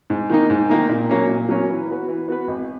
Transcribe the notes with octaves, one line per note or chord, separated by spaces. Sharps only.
G#2
D#3 A#3 D#4
G#2
D#3 A#3 D#4
A#2
F#3 A#3 C#4
A#2
F#3 A#3 C#4
E3
B3 F#4 B4
E3
B3 F#4 B4
G#1